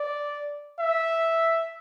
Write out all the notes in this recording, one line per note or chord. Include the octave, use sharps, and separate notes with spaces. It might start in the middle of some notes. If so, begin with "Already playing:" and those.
Already playing: D5
E5